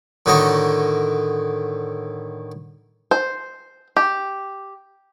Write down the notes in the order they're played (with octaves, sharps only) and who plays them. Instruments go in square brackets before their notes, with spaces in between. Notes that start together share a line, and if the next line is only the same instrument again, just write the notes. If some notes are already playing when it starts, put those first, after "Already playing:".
[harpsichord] A2 D3 D#3 F#4 D#5
[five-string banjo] C5
G4